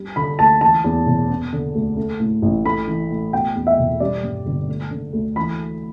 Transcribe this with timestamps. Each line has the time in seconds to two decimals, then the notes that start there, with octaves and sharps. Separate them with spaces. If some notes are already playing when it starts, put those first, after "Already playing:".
Already playing: G3
0.16 D3 B5
0.39 D2 A5
0.61 E3 A5
0.84 E2
1.06 E1
1.29 B3
1.53 D3
1.75 D2
1.97 A3
2.20 A2
2.42 A1
2.65 A3 B5
2.87 E3
3.10 A2
3.33 B2 G5
3.55 E2
3.67 E5
3.78 E1
4.00 G3 D5
4.23 G2
4.46 G1
4.68 A3
4.91 D3
5.13 D2
5.36 E3 B5